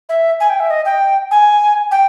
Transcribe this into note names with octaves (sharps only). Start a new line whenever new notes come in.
E5
G#5
G5
E5
D#5
G5
G#5
G5